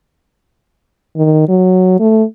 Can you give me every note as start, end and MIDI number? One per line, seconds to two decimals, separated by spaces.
1.17 1.47 51
1.49 1.98 54
2.00 2.24 57